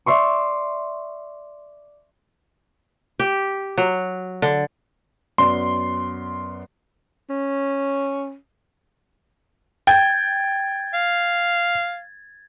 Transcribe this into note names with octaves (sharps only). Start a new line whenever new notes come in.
D5 E5 C6 C#6
G4
F#3
D3
F#2 B3 D5 C6
C#4
G5 G#6 A6
F5